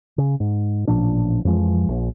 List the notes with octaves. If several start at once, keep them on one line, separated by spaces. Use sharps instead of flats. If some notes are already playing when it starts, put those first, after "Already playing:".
C#3
G#2
A1 A#2 F3 D4
F2 E3 F3 G#3
A#1